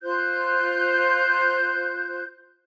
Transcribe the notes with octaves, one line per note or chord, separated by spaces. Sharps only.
F4 C5 F#6 G6